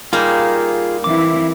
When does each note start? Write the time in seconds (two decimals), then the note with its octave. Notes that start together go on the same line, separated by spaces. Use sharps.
0.13 G3 A#3 D#4 F4 G#4
1.04 E3 C4 E4 D6